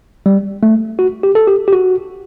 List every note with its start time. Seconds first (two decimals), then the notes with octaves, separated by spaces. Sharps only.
0.26 G3
0.63 A3
0.99 F#4
1.23 G4
1.35 A4
1.47 G4
1.68 G4
1.73 F#4